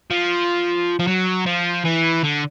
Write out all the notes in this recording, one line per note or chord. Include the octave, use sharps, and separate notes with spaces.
F3
F3
F#3
F3
E3
D3